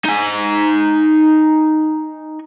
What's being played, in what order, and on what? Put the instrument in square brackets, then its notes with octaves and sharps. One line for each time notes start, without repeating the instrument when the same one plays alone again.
[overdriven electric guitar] D#4 G#5